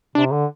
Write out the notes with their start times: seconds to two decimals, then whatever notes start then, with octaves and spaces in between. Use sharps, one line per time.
0.15 C3 D4
0.32 D3